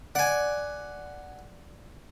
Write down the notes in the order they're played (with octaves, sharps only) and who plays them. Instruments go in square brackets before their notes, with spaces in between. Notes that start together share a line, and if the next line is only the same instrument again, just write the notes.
[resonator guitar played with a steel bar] D5 [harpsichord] F#5 G#5